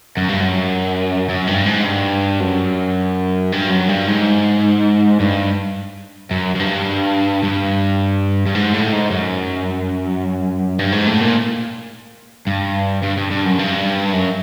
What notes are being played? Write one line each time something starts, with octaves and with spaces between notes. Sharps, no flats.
F#2
G2
F#2
F#2
G2
G#2
G2
F#2
G2
F#2
G2
G#2
G2
F#2
F#2
G2
G2
G2
G#2
A2
G#2
F#2
G2
G#2
A2
A#2
G2
G2
G2
G2
F#2
G2
F#2